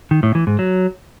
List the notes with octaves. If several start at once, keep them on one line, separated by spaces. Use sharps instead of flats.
D#3
A2
E3
G#2
F#3